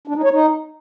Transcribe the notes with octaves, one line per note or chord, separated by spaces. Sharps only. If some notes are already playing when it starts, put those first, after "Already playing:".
D4
D#4
C#5
D#4